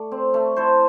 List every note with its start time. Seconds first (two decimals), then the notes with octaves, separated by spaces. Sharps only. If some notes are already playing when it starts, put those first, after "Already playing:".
Already playing: A3 D5
0.12 C4
0.34 A3
0.56 E4 A4 C5